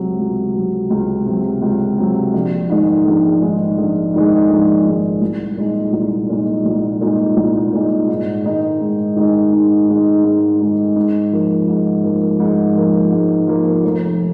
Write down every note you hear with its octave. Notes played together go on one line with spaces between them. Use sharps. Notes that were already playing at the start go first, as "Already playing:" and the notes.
Already playing: C#2 C3 F#3
C#2
C3 F#3
C#2
C3 F#3
C#2
C3 F#3
A#1
G#2 D#3 G#3
A#1
G#2 D#3 G#3
A#1
G#2 D#3 G#3
A#1
G#2 D#3 G#3
C2
A#2 G#3 D#4
C2
A#2 G#3 D#4
C2
A#2 G#3 D#4
C2
A#2 G#3 D#4
G#2
D#3 G#3 D#4
G#2
D#3 G#3 D#4
G#2
D#3 G#3 D#4
G#2
D#3 G#3 D#4
G#2
F3 A#3
G#2
F3 A#3
G#2
F3 A#3
G#2
F3 A#3
F1